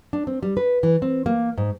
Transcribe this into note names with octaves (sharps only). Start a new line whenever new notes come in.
D4
C4
G3
B4
E3
C4
A#3
G#2